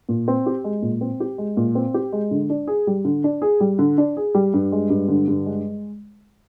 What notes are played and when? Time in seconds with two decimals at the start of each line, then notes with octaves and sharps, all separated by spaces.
0.09 A#2
0.28 C4
0.46 G4
0.64 G#3
0.82 A#2
1.01 C4
1.20 G4
1.38 G#3
1.57 A#2
1.75 C4
1.94 G4
2.13 G#3
2.31 D3
2.50 D4
2.67 G#4
2.87 G3
3.05 D3
3.24 D4
3.42 G#4
3.60 G3
3.79 D3
3.98 D4
4.17 G#4
4.35 G3
4.54 G2
4.72 G#3
4.90 G2
5.08 D3
5.28 G2
5.46 G#3